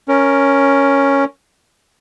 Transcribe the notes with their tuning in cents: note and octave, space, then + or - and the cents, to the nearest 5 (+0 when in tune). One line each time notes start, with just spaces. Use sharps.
C#4 +0 A#4 +0